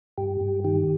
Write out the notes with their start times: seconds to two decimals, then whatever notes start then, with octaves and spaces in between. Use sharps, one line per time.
0.18 G2 G4
0.41 G2
0.64 D#3 G4